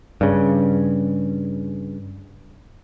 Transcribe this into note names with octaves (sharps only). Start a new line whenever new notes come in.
G2 C#3